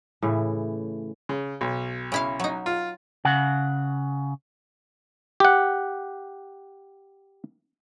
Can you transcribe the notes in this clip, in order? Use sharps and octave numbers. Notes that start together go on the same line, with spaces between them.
A2 C#3 E3
C#3
B1
C#3 E4 F5
F#3 D#4
F4
C#3 F#5
G4 F#5